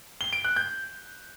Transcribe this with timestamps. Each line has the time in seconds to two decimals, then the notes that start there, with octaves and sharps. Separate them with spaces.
0.21 G7
0.33 D7
0.44 F#6
0.56 G6